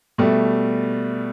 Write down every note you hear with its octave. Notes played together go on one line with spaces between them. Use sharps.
B2 G3 A3